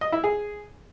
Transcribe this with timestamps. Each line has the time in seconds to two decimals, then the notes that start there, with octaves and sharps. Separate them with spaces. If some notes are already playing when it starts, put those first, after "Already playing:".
0.01 D#5
0.12 E4
0.24 G#4